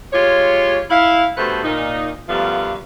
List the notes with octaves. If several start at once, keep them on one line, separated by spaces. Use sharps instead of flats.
G#3 F4 G4 C#5
E4 F5
G2 B2 A3 B3 B4 C5
A#2 D#4
F#2 F3 G3 A3 B3 F5